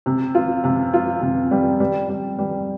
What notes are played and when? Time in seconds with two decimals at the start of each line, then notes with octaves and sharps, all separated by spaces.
0.06 C3
0.35 F4
0.64 C3
0.93 F4
1.22 C3
1.51 G3
1.80 G3
2.09 G3
2.39 G3